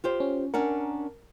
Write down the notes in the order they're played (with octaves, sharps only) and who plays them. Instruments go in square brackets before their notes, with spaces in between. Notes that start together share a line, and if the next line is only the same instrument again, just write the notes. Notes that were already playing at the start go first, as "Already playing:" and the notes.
[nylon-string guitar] F4 G4 C5
[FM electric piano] C#4
[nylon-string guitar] C#4 D4 F#5 [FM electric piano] A#4